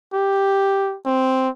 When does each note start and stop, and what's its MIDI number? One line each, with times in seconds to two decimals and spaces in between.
0.14 0.97 67
1.06 1.49 60